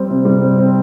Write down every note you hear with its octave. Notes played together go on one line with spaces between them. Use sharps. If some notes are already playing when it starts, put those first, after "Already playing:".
Already playing: G3 C4
C3
G3
C4
C4